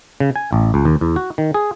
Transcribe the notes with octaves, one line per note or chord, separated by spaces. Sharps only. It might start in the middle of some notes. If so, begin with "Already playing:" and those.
C#3
G#5
A1
C#2
D#2
E2
F#4
D#3
G#4